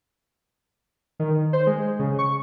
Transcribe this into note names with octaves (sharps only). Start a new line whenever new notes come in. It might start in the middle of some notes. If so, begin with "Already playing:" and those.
D#3
C5
G#3
C#3
C#6